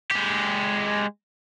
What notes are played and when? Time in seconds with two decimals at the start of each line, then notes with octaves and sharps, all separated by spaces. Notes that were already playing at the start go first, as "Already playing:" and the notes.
0.11 G#3 G4